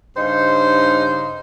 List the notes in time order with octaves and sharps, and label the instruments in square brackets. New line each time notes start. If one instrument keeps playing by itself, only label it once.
[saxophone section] G2 C#3 D#4 C5